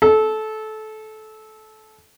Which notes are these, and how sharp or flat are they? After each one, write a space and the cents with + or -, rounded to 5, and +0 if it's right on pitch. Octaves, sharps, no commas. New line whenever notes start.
A4 -20